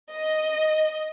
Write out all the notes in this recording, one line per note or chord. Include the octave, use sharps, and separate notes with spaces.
D#5